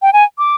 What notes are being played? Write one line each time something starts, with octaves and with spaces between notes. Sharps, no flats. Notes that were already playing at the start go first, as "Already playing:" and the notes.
G5
G#5
D6